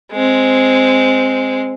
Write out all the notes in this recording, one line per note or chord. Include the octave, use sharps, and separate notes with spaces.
G#3 C4